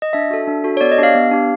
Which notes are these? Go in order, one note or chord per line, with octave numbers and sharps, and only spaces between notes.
D#5
D4 E5
F#4 A4
D4
F#4 A4
C#5
B3 D5
D#5
D4 G4 F5
B3
D4 G4